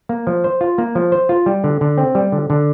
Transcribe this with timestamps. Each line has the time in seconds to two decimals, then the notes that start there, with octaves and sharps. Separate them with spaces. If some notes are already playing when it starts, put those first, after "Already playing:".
0.09 A#3
0.27 F3
0.44 C5
0.61 F4
0.78 A#3
0.95 F3
1.12 C5
1.29 F4
1.46 G3
1.64 D3
1.81 D3
1.98 C4
2.15 G3
2.32 D3
2.50 D3